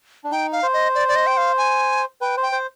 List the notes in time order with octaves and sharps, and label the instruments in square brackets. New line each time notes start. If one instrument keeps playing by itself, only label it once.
[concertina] D4
[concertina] D#4 [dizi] G5
[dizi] F5
[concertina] C5
[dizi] D#5
D5
D5
D#5
G5
F5
G#5
[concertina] B4 [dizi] G5
[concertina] C5
[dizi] G5
[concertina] C5